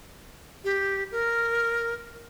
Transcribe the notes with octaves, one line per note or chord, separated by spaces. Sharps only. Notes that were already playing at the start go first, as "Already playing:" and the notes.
G4
A#4